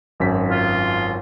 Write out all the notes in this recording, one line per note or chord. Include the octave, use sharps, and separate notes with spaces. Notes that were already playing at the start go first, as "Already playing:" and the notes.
G#1 F#2 B6
F4